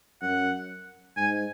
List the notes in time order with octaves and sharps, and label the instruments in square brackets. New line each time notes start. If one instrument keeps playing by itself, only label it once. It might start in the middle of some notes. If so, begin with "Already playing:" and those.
[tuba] F#2 [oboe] F#5
[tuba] G#2 [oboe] G#5